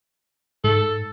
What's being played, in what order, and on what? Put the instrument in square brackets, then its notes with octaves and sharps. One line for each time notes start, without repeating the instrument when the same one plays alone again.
[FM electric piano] G#2 [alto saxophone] A4